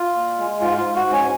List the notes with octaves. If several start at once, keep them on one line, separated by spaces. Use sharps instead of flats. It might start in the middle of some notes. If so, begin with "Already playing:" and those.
Already playing: F4
A#2
G#3
G#2 F4
F4
G#2
F#4
G#2
C#4